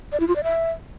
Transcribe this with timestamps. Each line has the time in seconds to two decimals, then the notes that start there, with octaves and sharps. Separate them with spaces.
0.12 D5
0.20 E4
0.28 F4
0.36 D5
0.44 E5